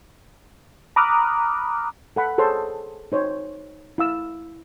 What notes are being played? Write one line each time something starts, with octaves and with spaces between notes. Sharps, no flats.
A#5 B5 D6 D#6 F6 F#6
A4 F#5 B5
G#4 A4 C5 C#5 A5 C6
D#4 C5 C#5
E4 F5 E6